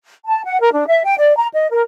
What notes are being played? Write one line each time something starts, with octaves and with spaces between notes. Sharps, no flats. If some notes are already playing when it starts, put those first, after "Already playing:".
A5
F#5
A#4
D4
E5
G5
D5
A#5
D#5
A#4